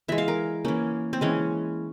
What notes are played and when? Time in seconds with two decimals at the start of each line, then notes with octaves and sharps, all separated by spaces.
0.08 E3 G#3 E5
0.18 F5
0.28 A#4
0.65 E3 A#3 C#4
1.13 C4
1.21 E3 G#3 C#4